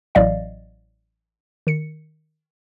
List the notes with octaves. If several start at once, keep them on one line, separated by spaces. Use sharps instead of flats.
A1 A2 F#3 D5 D#5 F5
D#3 C#7